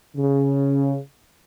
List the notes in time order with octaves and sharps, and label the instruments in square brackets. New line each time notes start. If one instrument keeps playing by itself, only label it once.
[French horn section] C#3